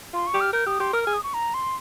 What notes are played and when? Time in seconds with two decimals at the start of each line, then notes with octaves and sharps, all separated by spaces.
0.13 F4 C6
0.27 C#6
0.34 G4
0.41 F6
0.53 A#4 G6
0.66 G4 D#6
0.80 G4 C6
0.93 A#4 F6
1.04 G#4 F6
1.13 D#6
1.23 C#6
1.34 A#5
1.54 C6